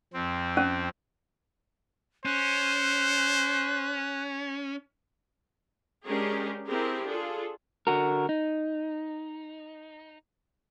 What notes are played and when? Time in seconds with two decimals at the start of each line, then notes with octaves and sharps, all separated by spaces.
0.13 F2 C4
0.57 C#4
2.25 C#4 C5 F#6
6.06 G#3 C#4 D4 G4 G#4 A#4
6.66 C4 E4 G4 G#4 A#4
7.06 D4 F4 G#4 A4
7.87 D3 F#4 A#4
8.29 D#4